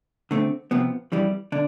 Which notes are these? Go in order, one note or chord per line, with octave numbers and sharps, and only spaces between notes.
D3 A3 C4
C3 F3 B3
F2 E3 G3
D3 D4